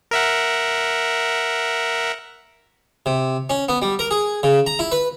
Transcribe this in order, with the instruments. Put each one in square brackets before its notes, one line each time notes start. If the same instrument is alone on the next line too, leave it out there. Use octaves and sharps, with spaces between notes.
[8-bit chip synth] A#4 E5 F#5
[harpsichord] C3
C#4
B3
G3
A#4
G#4
C#3
A#5
E4
B4